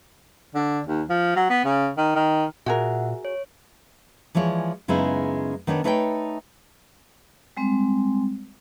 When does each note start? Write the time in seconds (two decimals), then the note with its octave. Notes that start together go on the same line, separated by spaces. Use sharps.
0.55 D3
0.87 D#2
1.09 F3
1.36 F#3
1.50 B3
1.65 C#3
1.98 D#3
2.16 D#3
2.66 A#2 F#4 G#4 A#4 E5 F#5
3.25 C#5
4.35 E3 F3 G#3 C#5 D5
4.88 F#2 C#3 G#3 B3 D#4 E4
5.67 D#3 B3 D4 C#5
5.84 A3 D#4 B4 C#5 F#5 G5
7.57 G3 G#3 C4